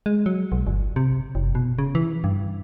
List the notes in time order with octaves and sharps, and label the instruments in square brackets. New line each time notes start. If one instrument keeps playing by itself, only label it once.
[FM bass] G#3
F#3
B1
G1
C3
F#1
B2
C#3
E3
G2